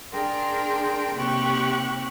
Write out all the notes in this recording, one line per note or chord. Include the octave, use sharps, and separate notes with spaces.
D4 G#4 A#4 G5 C6
D#2 C3 G4 C#6 F#6